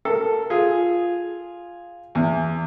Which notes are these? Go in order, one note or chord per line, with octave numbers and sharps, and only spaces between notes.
A4 A#4
F4 G#4
E2